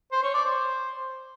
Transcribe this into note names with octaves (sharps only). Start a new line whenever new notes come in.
C5
C#5
D5
C5